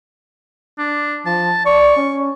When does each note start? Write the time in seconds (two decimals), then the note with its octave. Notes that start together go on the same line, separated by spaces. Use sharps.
0.78 D4
1.26 F3 A5
1.65 D5 C#6
1.96 C#4